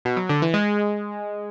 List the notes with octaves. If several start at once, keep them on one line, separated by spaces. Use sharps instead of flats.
B2
F#3
D3
E3
G#3